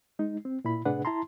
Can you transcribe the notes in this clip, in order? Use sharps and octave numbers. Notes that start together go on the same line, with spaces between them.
G#3 D#4
C4
A#2 E4 B5
A2 C3 D4 G#4 B4 F#5
E4 A5 A#5 C6